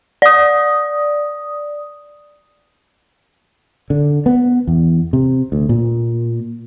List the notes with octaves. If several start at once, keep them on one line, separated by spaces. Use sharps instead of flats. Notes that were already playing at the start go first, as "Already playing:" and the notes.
D5 D#6
D3
B3
E2
C3
D2
A#2